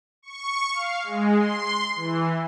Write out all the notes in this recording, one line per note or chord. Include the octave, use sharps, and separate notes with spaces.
C#6
F5
G#3
C6
E3